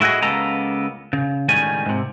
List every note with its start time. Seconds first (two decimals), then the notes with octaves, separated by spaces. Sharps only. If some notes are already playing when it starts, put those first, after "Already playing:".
0.01 A2 E4 F#4 G#4 D#5
0.22 C#2 C#3 A#3 B3 A4 A#5
1.13 C#3
1.49 C#2 A2 D#3 G3 C#4 G#5
1.86 G#2 C3